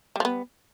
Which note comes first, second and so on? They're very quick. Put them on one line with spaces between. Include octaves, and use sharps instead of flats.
G3 F3 B3